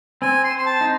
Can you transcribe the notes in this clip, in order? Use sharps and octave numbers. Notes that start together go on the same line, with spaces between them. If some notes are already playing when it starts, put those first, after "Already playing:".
C4 G#5
C6
C5
C6
A5
D#4